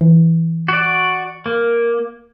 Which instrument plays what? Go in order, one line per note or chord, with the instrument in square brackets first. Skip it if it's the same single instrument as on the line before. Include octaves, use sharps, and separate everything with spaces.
[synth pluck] E3
[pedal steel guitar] F#4 D5
A#3